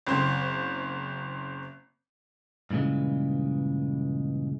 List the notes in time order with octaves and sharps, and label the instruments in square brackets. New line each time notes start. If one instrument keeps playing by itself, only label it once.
[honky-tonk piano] F#1 C4 C5
[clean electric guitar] G2 A#2 C#3 E3 G#3